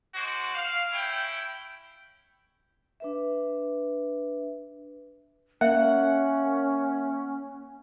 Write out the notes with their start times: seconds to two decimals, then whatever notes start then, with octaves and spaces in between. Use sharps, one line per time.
0.15 G#3 F#4 C5 D6
0.54 F5
0.92 C#4 E4 G5
3.00 D4 B4 E5
5.61 A#3 C#4 E5 F#5